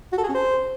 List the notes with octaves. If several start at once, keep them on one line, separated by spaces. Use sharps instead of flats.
F#4
A4
G#4
C#4
C5